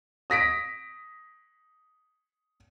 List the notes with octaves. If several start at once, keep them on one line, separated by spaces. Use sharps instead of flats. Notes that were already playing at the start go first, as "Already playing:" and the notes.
D#6 A#6 B6 D7